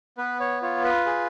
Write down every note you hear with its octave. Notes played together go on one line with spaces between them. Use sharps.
B3 B4
C#5
F4 C#5
B4
G#4